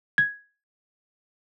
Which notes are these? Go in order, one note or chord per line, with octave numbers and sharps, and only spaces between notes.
G#6